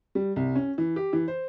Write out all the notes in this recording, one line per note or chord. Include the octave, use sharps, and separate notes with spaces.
G3
C2
C#4
E3
G4
E3
C5